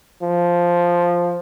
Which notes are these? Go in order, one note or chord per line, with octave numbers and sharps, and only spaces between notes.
F3